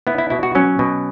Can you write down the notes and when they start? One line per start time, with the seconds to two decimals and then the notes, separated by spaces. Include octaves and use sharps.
0.07 B3 E4
0.18 E4
0.30 B2 E4
0.43 F#4
0.55 F#3 C#4
0.79 B2